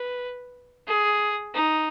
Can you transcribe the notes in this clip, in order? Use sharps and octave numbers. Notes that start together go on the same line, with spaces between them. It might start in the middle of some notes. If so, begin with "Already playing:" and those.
Already playing: B4
G#4
D#4